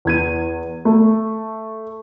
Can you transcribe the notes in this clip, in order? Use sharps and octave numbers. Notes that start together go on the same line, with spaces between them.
E2 G#6 D#7
A3